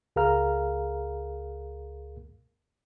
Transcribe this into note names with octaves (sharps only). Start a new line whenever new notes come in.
C#2 G#4 A#4 F5 A#5 F6